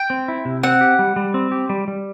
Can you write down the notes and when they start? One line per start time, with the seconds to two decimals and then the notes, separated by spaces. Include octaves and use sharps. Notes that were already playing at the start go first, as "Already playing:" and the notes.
Already playing: G5
0.10 C4
0.28 E4
0.45 C3
0.63 C4 F#5
0.81 G4
0.99 G3
1.16 G3
1.34 C4
1.52 G4
1.69 G3
1.88 G3